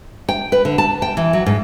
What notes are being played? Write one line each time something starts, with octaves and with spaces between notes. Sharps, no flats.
G5
B4
D3
A5
G5
E3
F#3
G#2